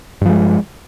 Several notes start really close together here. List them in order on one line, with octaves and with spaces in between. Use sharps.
G2 F3 G#3